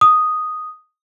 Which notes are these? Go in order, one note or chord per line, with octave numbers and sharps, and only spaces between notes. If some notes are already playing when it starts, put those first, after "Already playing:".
D#6